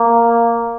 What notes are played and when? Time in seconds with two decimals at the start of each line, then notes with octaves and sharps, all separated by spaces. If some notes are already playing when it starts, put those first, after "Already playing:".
Already playing: A#3